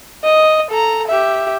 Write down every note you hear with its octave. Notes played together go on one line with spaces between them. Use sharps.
D#5
A4 A#5
G4 E5